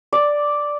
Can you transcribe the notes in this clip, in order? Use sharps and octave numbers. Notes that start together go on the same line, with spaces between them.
D5